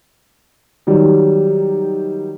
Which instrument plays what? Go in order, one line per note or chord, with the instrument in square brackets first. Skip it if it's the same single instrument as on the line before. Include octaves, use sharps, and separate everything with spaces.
[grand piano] D#3 F#3 G3